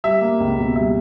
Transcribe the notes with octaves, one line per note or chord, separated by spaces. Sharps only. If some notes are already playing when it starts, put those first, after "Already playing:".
G3 E5
A#3
C#2
B2
G3 E5